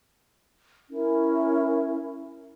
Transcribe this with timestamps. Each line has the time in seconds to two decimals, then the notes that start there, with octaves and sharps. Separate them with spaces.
0.91 C#4 E4 A#4